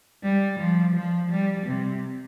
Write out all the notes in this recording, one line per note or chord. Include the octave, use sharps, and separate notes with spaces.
G3
F3
F3
G3
C3